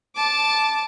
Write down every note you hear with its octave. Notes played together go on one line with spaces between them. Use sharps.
A5 D6